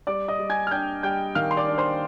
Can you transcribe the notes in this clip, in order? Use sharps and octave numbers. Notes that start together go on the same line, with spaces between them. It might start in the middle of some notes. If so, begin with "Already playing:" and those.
G3 D5 D6
D#5 D#6
G3
G#5 G#6
F6
D4 G5 G6
G3 G5 G6
D#3 F5 F6
C6
D5 D6
D4
C5 C6